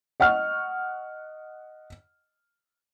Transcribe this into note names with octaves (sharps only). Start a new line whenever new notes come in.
D#5 F#5 C#6 F6